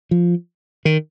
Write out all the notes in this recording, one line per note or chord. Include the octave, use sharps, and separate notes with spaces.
F3
D#3